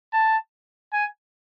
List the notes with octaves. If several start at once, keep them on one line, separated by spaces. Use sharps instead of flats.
A5
G#5